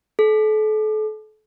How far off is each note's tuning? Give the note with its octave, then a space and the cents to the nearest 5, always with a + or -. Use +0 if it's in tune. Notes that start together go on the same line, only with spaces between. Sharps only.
A4 -35